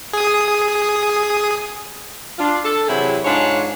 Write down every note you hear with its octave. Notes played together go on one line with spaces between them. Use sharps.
G#4 D#6
D4 F4
A4
C3 E3 F#3 E4 G4 G#4
G#2 D4 F4 C#5